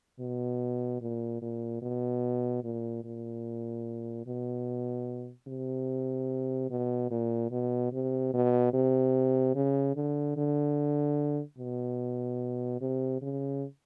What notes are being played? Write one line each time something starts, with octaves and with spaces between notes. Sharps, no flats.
B2
A#2
A#2
B2
A#2
A#2
B2
C3
B2
A#2
B2
C3
B2
C3
C#3
D3
D3
B2
C3
C#3